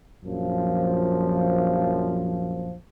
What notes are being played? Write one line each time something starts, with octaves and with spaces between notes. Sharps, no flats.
A#1 F#2 F3